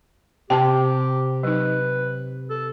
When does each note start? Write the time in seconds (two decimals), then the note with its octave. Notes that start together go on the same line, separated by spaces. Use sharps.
0.50 C3 G4 G5 A5
1.43 F#3 D#4 B4
2.50 A4